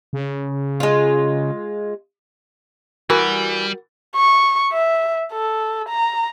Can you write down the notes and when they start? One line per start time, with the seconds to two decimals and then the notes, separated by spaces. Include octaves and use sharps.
0.13 C#3
0.80 G#3 F4
3.10 E3 G3 F#4 A#4
4.16 C#6
4.72 E5
5.33 A4
5.89 A#5